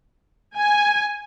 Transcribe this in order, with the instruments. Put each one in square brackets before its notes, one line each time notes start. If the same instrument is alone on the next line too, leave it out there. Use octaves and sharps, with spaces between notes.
[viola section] G#5